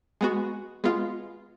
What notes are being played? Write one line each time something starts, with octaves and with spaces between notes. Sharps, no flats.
G#3 B3 F#4
G#3 B3 F4